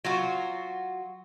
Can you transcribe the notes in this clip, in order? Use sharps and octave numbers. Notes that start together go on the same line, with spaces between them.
F#3 F4 F#4